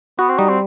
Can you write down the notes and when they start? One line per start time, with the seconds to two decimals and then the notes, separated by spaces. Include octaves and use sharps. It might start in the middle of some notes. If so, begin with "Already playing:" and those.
0.19 B3 F#4
0.29 C4
0.38 G3 D#4
0.49 C4